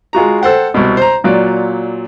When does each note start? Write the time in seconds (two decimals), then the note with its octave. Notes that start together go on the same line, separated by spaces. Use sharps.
0.13 G#3 F4 F#4 A#5
0.41 A4 C5 F#5 G5
0.74 C2 B2
0.97 C5 A#5
1.24 A#2 F#3 F4 D5